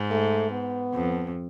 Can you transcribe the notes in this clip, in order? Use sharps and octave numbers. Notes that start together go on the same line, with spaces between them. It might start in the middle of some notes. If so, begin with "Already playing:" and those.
Already playing: G#2
A3
B3
F2